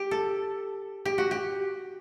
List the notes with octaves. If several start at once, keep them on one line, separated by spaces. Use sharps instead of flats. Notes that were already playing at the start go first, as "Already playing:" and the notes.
Already playing: G4
A4
G4
F#4
G4